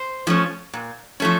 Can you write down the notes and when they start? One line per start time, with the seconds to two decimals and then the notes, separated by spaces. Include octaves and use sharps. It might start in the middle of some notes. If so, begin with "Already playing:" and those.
Already playing: C5
0.27 F3 A3 C#4
0.73 A#2
1.20 F3 A3 C#4